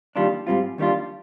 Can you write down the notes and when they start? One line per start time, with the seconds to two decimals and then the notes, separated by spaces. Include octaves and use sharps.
0.16 D#2 D#3 G3 D4 F4
0.47 G#2 G3 C4 F4
0.78 D#2 D#3 G3 D4 F4